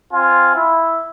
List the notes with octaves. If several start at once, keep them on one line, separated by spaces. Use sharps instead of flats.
C4 F4 G#5
E4